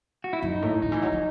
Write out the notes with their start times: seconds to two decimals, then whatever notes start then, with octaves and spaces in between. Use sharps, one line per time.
0.24 F#4
0.33 E4
0.42 F#2 D#4
0.62 A2
0.82 C#3 D#4
0.92 E3
1.02 F#3
1.12 F#3